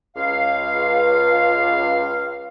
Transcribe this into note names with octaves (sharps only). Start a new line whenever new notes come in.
C#2 F5